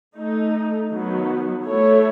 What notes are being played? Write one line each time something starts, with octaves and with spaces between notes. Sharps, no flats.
A3 D#4 A4
D#3 F#3 B3
A3 E4 A4 C#5